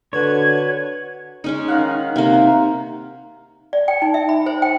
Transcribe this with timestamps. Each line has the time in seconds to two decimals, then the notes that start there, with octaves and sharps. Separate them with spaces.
0.13 D3 F#4 B4 C#5 G#6
1.44 G#3 C#4 D#4
1.68 D#3 F5 F#5
2.16 C3 A#3
3.73 D5
3.88 G5
4.02 D#4
4.14 E5
4.29 B5
4.46 C5
4.62 G5